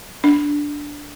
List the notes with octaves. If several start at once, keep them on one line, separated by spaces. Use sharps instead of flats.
D4